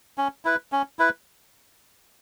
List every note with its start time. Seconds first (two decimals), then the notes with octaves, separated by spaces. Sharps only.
0.18 C#4
0.45 E4 B4
0.72 C#4
0.99 E4 B4